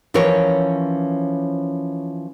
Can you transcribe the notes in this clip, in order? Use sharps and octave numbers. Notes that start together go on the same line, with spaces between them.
E3 F3 C#4 A#4 C#5